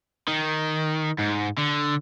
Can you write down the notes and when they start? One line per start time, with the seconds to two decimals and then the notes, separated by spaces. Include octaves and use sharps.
0.28 D#3
1.19 G#2
1.58 D3